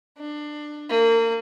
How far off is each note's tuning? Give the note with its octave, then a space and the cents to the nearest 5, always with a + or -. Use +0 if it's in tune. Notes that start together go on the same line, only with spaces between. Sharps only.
D4 +20
A#3 -30